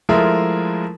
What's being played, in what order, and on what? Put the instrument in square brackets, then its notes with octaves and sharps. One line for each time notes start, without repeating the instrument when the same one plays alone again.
[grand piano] F3 G#3 A3 E4 G#4 A#4